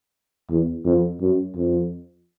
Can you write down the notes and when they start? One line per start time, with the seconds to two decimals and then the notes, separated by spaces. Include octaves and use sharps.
0.50 E2
0.85 F2
1.21 F#2
1.56 F2